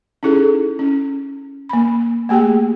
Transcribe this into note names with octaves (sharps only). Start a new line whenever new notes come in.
C#4 D#4 E4 G#4 A4
C#4
A#3 B5
A3 A#3 G4 G#4 G5